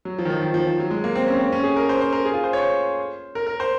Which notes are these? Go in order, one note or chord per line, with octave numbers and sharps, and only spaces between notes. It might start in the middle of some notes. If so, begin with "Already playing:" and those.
F#3
F3
D#3
F3
D#3
F3
F3
F#3
G#3
A#3
C4
C#4
C4
C#4
G#4
A#4
C5
C5
A#4
G#4
F4
C5
C#5
C5
A#4
A#4
C5